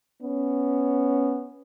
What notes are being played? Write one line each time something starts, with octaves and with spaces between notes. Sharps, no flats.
B3 C#4